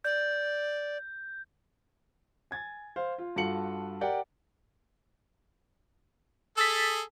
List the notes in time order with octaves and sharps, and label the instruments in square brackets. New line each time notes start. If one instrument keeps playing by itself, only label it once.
[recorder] D5 [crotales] G6
[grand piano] G#5 G#6 A6
C5 F5
F4
G2 F4 F#4 A4 C#7 F#7
G4 A#4 D5 F#5 G5
[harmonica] G#4 A4 [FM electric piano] E6 A6 B6